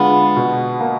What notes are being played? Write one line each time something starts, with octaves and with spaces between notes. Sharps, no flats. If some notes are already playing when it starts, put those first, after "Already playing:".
Already playing: D3 G#3 B3 D4 F4
B2
A#3